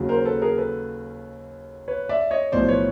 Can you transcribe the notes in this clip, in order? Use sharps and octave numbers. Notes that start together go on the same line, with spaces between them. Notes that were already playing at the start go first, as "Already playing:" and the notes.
Already playing: D#2 C#3 F#3
A#4 C5
A4 B4
G#4 A#4
A4 B4
B4 C#5
D5 E5
C#5 D#5
B1 A2 F3 C5 D5
B4 C#5